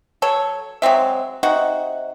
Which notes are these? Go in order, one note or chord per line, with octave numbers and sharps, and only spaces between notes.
F#3 A4 C#5
F#3 G#3 C4 E5
C3 D#4 F#4 F#5